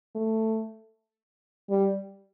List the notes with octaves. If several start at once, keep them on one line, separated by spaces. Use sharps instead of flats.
A3
G3